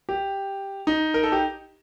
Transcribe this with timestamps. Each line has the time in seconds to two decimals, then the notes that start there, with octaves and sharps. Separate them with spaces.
0.09 G4
0.87 D#4
1.14 A#4
1.23 A4
1.32 G4